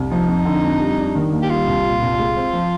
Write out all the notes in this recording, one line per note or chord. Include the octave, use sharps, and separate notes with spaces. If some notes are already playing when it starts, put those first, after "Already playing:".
Already playing: C2
F3 D#4
F2
D3
F2
G3
D4
D#3
D#2
G4
G3 F4
C2
A#2
C2
G#3
C4
F3